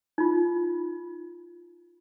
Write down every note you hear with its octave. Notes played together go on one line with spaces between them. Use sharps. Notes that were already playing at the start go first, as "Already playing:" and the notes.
D#4 F4